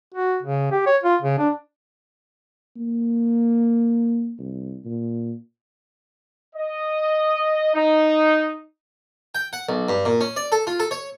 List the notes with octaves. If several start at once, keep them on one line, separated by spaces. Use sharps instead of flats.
F#4
C#3
G4
C#5
F4
C#3
D4
A#3
C2
A#2
D#5
D#4
G5
F#5
B1
G2
A#2
C#4
D5
A4
F4
A4
C#5